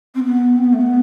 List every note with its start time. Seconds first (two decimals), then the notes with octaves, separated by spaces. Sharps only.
0.15 C4
0.24 B3
0.57 C4
0.64 B3
0.73 A3
0.81 B3